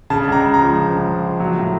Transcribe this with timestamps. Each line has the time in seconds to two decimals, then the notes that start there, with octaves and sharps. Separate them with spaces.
0.10 C#3 A5
0.27 C#2
0.32 A#5
0.44 C#2
0.54 A#5
0.59 F3
0.75 C#3
0.91 C#2
1.07 C#2
1.24 F3
1.40 F#3
1.56 A2